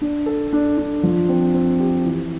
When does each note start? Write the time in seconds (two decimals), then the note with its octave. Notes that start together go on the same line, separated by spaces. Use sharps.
0.01 D4
0.26 A4
0.53 D4
0.78 D4
1.03 F3
1.29 C4
1.54 C4
1.80 G4
2.05 E3